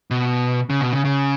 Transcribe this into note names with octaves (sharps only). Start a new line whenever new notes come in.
B2
C#3
B2
C#3
C#3